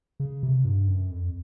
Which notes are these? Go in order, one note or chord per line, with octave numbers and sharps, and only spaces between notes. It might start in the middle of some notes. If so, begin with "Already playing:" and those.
C#3
C3
G2
F#2
F2